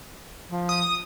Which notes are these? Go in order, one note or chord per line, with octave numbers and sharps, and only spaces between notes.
F3
D#6